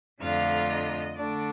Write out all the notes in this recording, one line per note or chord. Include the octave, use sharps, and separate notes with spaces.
F2 D3 A3 D4 F4 F5
D#5
D3 A3 D4 D5